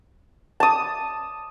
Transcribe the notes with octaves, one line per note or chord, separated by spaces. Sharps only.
A5 D#6